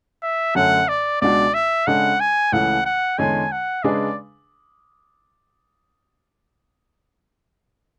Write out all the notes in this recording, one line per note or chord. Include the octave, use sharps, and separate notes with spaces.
E5
F#2 D3 A3 C#4 F#5
D5
C#2 B2 G#3 D4 F#4 D5
E5
C#3 G#3 D4 A4 F#5
G#5
C#2 C#3 E3 A3 F#5
F#5
E2 D3 G#3 C#4 G#5
F#5
C#3 G#3 D4 G#4 B4 D5